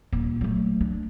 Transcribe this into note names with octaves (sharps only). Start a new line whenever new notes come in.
D#1 D#4
F#3 A3
D4